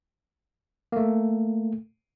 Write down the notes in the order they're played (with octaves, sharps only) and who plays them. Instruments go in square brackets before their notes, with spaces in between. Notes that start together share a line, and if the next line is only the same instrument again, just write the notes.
[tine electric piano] A3 A#3